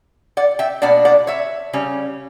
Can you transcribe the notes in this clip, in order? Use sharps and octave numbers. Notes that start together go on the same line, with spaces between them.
D5 F#5
E5 G5
B2 A#3 D4 D5 F#5
D5 F#5
C#5 E5
C#3 G3 C#4